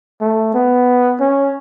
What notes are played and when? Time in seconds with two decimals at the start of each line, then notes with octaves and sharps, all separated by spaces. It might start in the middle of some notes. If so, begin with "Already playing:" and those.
0.21 A3
0.54 B3
1.20 C#4